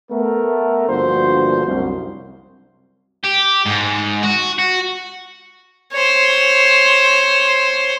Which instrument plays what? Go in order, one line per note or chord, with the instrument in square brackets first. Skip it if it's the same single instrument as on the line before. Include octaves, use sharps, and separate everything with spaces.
[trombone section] A3 B3 A#4
D2 G2 F3 A#3 F#4 C5
C2 F#2
[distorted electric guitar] G4
G#2
F#4
F#4
[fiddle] C5 C#5